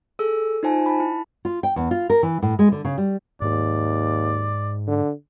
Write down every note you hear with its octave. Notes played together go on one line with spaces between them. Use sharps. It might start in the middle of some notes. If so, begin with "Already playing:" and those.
G#4 A4 E6
D#4 F4 C5 G#5 A5
A5 B5
E4
F4
G5
E2
F4
A#4
E3
A2
G#3
D3
C#3
G3
D#2 G#2 D5
D3